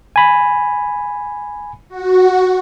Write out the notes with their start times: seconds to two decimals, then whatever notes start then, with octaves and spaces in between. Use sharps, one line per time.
0.16 G#5 B5
1.89 F#4